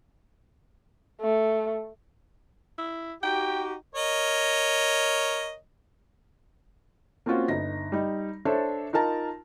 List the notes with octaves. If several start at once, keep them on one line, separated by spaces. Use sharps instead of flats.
A3
E4
D#4 F#4 G4 G5
A#4 C#5 D#5
A#3 C4 C#4 F4 F#4
G1 D#4 A#6
G3 D#4
D4 A4 C5 C#5 E5
D#4 F4 A#4 A5 A#5